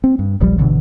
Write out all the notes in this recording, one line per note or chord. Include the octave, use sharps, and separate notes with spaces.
C4
G2
D#1 A#1 F3 G3
G1 B2 D3 E3